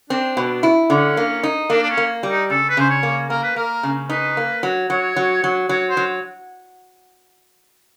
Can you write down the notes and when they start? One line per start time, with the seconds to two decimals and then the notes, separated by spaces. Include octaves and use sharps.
0.10 C4 D4
0.37 B2
0.63 E4
0.90 D3 C#4
1.17 A#3
1.43 D#4
1.70 A#3 D4
1.83 D4
1.90 C#4
1.97 A#3
2.23 G3
2.30 D#4
2.50 C#3 A4
2.69 B4
2.77 C#3 C5
2.90 C#5
3.03 A#3
3.30 A#3 A#4
3.43 B4
3.56 A#3 A#4
3.83 C#3
4.09 D#4 B4
4.37 A#3
4.63 F#3
4.90 F#3 C#5
5.16 F#3
5.44 F#3
5.69 F#3 C#5
5.90 C5
5.97 F#3